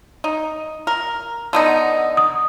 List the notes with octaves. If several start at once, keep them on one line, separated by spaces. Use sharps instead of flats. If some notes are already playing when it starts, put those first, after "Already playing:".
D#4
A#4
D3 B3 D#4
D#6